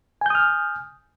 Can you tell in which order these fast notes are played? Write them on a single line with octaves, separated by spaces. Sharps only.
G#5 G6 D#6 F6